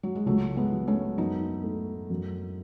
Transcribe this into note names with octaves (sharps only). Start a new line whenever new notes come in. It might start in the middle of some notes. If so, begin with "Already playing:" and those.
F#3
G#3
C#2 F#3 A3
G#3 B3
F#3
A3 C#4
F#2 B3 D#4
A3
F#2